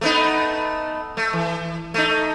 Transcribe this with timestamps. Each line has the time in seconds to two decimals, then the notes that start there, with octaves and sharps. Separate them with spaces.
0.01 A3 B3 D#4
1.17 A3
1.33 E3
1.94 A3 D#4